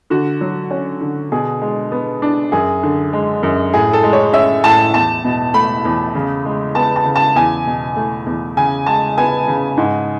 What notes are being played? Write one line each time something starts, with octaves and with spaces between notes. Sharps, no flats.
D3 F#4
F#3
C#4
D3
B2 G#4
G#3
B3
D4
F#2 G#4
D3
G#3
F#2
A2 G#4
A4
G#3
C#5
C#4 E5
A2 A5
E2 A5
B2
A3 B5
E2
C#3
G#3
B3 A5
A5
C#3
A5
E2 G#5
B2
A3
E2
C#3 G#5
G#3 A5
B3 G#5
C#3
G#2